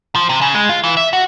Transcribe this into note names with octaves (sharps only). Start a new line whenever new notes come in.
F3
C3
C#3
G#3
F4
E3
E5
F#4